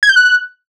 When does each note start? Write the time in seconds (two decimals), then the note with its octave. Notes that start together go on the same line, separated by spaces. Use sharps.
0.03 G#6
0.09 G6
0.16 F#6